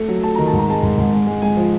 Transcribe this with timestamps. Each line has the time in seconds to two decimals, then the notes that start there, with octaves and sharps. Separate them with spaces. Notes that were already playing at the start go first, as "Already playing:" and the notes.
Already playing: A3
0.08 F#3
0.23 A3 A5
0.35 D#3 A#5
0.47 A5
0.53 G#2
0.58 A#5
0.68 G#3 A5
0.83 G#2
0.98 G#2
1.12 G#3
1.27 G#3
1.42 G#3 G#5
1.57 F3